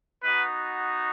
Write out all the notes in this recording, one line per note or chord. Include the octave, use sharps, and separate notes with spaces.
B3 D#4 F#4 B4